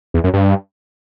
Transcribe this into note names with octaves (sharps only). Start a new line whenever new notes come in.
E2
F#2
G2